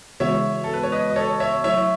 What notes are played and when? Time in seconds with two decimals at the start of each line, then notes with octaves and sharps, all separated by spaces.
0.20 C#3 E3 G#3 B3 F#4 C#5 E5
0.64 A4
0.73 B4
0.83 C#5
0.92 B4 D#5
1.10 D#5
1.16 A4 C#5
1.40 C#5 E5
1.64 F#3 A3 E4 C#5 E5